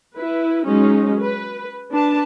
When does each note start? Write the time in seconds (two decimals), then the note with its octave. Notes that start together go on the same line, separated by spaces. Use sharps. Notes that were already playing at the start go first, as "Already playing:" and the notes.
0.15 E4 B4
0.65 F#3 G#3 C#4 D#4
1.20 B4
1.91 D4 B4 A5